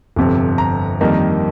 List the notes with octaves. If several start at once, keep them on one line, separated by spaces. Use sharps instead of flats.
G1 F2 C3
A#5
F2 D#3 G3 A#3 D#4